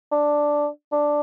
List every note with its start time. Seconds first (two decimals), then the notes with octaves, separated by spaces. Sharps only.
0.12 D4
0.93 D4